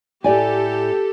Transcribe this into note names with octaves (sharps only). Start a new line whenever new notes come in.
A2 G4 A4 D5 G#5